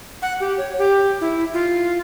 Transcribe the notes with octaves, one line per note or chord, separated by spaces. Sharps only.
F#5
G4
C#5
G4
E4
F4